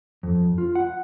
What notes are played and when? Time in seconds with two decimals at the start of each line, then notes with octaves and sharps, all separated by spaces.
0.23 F2
0.58 F4
0.75 F#5